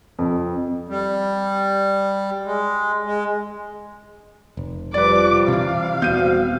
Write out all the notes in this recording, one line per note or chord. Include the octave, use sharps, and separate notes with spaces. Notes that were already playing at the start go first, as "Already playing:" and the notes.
F2
G3
G#3
G#3
F1
F3 G3 B4 D5 D6
C3 E3 F5
D#1 G3 B3 C4 F#4 G6 D#7